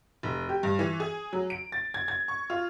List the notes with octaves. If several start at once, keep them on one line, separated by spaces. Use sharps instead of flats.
F1
G4
G2
E3
G#4
F#3
D7
A6
G#6
G#6
C#6
F4